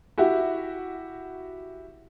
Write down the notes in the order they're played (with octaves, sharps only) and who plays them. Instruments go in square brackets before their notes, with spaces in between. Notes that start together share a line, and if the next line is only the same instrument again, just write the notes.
[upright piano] E4 F#4 G4 E5